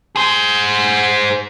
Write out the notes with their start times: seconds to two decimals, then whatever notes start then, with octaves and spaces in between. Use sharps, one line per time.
0.16 G#4 C5